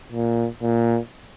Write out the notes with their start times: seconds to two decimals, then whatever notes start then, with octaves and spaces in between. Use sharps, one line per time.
0.12 A#2
0.62 A#2